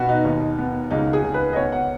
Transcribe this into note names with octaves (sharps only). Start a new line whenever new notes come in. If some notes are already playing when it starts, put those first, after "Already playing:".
Already playing: B2 B3 F#4 B4
D#4
D#2 D#4
B3
C#2 D#4
G#4
C#2
B4
D#5
B3 C#5
F#5